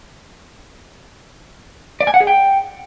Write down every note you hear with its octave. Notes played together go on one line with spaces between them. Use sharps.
D5
G#5
F#5
G#4
G5